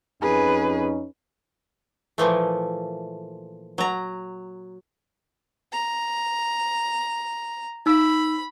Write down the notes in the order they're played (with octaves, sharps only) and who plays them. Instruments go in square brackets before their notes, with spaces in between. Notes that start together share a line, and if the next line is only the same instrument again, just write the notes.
[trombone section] F2 C#4 D#4 [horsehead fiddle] G#4 B4
[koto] A#2 E3 F3 A3
F#3 A#5
[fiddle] A#5
[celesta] D#4 E6 [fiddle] B5